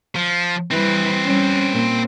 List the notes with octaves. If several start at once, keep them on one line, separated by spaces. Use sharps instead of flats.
F3
E3 G3 C4 B4
G3 C#4
A#2